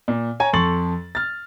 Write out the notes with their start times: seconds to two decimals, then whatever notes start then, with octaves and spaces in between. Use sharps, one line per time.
0.08 A#2
0.40 C#5 G#5 A#5
0.53 F2 A4 C6 C#6 A6 F#7
1.15 F6 A6